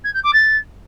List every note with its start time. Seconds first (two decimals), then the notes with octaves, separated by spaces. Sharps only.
0.04 G#6
0.14 G6
0.23 D6
0.33 A6